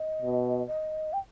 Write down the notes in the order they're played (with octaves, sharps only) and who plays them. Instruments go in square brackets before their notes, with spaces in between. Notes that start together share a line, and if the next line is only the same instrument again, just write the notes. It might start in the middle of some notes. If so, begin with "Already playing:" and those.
Already playing: [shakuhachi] D#5
[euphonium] B2
[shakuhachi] D#5
G5